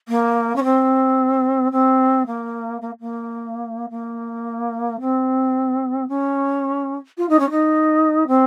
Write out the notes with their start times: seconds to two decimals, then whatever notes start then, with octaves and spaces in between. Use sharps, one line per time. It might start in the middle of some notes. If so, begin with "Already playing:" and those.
0.08 A#3
0.56 C#4
0.64 C4
1.72 C4
2.26 A#3
2.81 A#3
3.01 A#3
3.90 A#3
5.00 C4
6.08 C#4
7.17 F4
7.29 D#4
7.39 C#4
7.50 D#4
8.27 C4